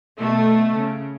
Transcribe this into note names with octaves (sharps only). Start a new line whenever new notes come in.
B2 A3
C#3